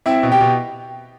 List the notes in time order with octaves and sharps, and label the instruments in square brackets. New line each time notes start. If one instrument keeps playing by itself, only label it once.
[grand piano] C4 E4 E5
B2
G4 G5
B2